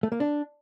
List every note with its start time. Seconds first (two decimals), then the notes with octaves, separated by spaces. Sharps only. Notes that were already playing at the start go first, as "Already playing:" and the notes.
0.03 A3
0.12 A#3
0.20 D4